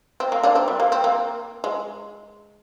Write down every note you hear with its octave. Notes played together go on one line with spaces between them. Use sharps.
C4
A#3
A#3 D4
C4
G3
A#3
C4
A#3
G#3